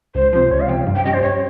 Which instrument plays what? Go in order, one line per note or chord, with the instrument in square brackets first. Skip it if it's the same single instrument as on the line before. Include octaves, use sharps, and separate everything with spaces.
[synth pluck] C#2 [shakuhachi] C5
[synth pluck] C3 F3 [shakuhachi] C5
[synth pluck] C#2 [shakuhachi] C#5
[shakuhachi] F5
[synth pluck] C3 F3 [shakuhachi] G5
[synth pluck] G2
[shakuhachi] G5
[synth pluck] G3 C#4 G4 [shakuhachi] D#5
[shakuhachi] C5
[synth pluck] G2 [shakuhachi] C#5